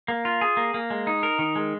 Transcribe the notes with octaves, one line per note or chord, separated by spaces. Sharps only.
A#3
F4
G#4
A#3
A#3
G#3
D#4
A#4
D#3
G#3